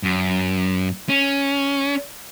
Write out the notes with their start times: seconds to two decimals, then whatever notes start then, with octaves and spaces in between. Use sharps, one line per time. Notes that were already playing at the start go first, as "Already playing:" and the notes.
0.03 F#2
1.09 C#4